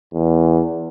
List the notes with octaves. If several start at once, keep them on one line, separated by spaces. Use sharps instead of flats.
E2